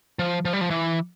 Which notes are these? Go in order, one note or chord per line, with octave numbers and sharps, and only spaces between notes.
F3
F3
G3
F3
E3